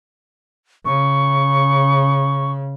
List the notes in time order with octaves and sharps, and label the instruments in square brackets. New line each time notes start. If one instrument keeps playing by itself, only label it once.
[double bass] C#3 [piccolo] C#6